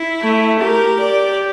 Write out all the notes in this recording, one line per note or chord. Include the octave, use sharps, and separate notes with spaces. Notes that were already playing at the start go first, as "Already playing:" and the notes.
Already playing: E4
A3
G4 A#4
D5